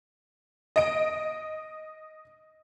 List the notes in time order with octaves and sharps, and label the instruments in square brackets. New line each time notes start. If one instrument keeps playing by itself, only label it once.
[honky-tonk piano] D#5 D7